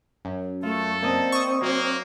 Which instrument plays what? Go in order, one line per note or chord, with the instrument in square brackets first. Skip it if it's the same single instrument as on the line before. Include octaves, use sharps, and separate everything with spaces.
[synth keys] F#2
[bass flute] A3 [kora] F4 [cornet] A4
[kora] A#3 D4 D#5 [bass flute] C4
[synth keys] C#6 D#6
[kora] F#3 F#4 [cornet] A#3